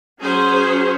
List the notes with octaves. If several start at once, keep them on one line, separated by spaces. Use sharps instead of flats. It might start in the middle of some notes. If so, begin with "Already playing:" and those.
F#3 C#4 G#4 C5